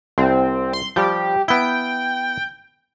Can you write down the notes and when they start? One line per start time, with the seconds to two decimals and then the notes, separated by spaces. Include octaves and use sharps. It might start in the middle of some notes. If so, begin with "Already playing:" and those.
0.18 C2 C4
0.73 C6
0.96 F3 G3 G4
1.48 B3 E4 G5